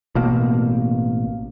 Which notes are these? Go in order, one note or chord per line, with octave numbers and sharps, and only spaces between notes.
A1 B2 A#3